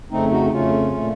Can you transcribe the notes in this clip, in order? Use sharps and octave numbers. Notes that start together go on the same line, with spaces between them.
F2 C#3 A3 C4 D#4
D#4 F#4
D#4
F2 C#3 A3 C#4 F4
A#2 A3